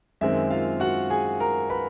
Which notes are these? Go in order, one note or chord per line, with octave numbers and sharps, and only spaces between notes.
F#2 D#3 G#3 C4 E5
F4 F5
F#4 F#5
G#4 G#5
A#4 A#5
B4 B5